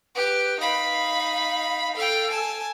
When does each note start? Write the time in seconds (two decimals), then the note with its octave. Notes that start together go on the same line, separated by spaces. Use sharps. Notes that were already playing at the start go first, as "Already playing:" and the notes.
0.16 G4 B4
0.61 D#4 F5 B5
1.96 A4 F5 G5
2.30 G#5 A5